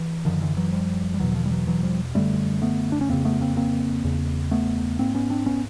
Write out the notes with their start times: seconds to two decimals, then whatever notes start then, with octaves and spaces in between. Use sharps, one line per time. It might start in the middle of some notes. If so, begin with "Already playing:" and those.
Already playing: E3
0.25 F#2 D3 D#3 F3
0.41 D3 E3
0.57 E3 F#3
0.72 F3 G3
1.14 G3
1.20 E2 B2 E3 F#3
1.31 E3
1.35 D#3 F3
1.46 G3
1.51 E3 F#3
1.67 E3 F#3
1.83 F3 G3
2.14 F#2 D3 G3 A3
2.62 A3 B3
2.92 D4
3.01 C#4
3.09 F2 C#3 A#3 C4
3.25 A3 B3
3.41 A#3 C4
3.57 A#3 C4
4.04 E2 C#3
4.51 A3 B3
4.99 G#2 A#3 C4
5.15 B3 C#4
5.30 C4 D4
5.46 B3 C#4